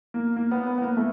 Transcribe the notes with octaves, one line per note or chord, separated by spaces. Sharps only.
A#3
A#3
B3
B3
B3
A#3
A3